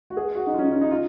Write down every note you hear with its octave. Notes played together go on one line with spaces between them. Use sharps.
F#4
G#4
F#4
D#4
F4
C#4
D#4
C#4
D#4
F4